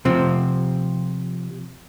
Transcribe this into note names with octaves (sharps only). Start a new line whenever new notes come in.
C3 F3 C4